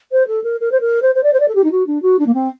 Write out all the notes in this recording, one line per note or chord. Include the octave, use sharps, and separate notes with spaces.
C5
A4
A#4
A#4
C5
A#4
C5
C5
D5
C5
D5
A4
G4
D#4
F#4
D4
F#4
D4
A#3
C4